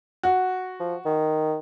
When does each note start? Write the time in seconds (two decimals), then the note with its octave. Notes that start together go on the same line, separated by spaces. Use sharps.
0.23 F#4
0.80 F3
1.05 D#3